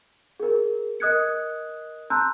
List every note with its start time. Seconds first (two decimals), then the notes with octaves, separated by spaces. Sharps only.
0.40 G#4 A#4
1.00 A#4 D#5 D#6 F#6 G#6 C#7
2.10 A5 A#5 C6 E6 F#6 G6